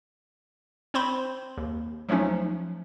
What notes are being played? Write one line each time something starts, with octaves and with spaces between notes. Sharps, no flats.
C4 C5 B5 C6
D#2
F3 F#3 A3 C#4 D#4